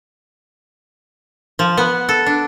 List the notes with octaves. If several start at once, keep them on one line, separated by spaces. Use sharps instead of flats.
F3
B3
A4
D4